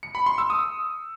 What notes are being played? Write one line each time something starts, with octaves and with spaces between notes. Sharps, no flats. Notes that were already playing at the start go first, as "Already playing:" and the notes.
C#7
B5
C6
E6
D#6